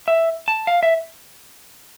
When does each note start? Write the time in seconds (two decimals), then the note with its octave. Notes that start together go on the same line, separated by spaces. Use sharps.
0.08 E5
0.48 A5
0.67 F5
0.83 E5